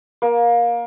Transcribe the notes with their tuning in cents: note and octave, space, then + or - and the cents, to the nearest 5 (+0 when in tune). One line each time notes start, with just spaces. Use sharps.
A#3 +20